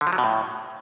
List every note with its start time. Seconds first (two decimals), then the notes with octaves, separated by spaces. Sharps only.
0.01 D3
0.07 F3
0.13 F#3
0.18 B2
0.24 A2